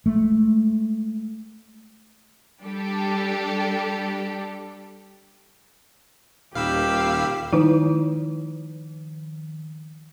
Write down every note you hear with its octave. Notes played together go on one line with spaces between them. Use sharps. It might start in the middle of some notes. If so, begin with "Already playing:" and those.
G#3 A3
G3 D4 G4 A4
D#1 D#2 A#2 G4 F5 B5 E6
D#3 F3 D#4 E4